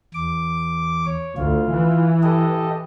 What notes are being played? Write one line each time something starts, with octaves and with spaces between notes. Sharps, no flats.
E2 D6
C#5
D2 F4
E3
G4 A4 D#5